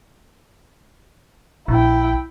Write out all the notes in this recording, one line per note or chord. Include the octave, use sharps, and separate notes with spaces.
A#1 E4 G5